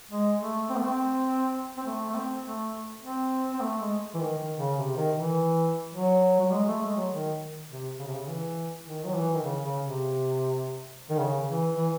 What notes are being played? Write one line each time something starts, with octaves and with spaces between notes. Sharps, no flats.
G#3
A3
C4
A3
C4
C4
A3
A3
C4
A3
C4
C4
A3
G#3
E3
D#3
D#3
C#3
C3
D#3
E3
F#3
F#3
G#3
A3
G#3
F#3
D#3
C3
C#3
C3
C#3
E3
D#3
F#3
E3
D#3
C#3
C#3
C3
D#3
C#3
E3
E3